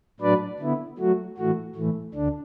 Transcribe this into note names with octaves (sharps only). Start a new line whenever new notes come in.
A2 F#3 D4 B4 D5
D3 B3 E4
F#3 A3 F#4
A2 E3 A3 F#4
A2 E3 A3
D2 D3 D4